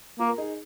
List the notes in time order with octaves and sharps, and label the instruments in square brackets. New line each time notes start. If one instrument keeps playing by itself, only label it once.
[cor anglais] A#3 [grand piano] F4 A#4
[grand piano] A#4
D#4 G#4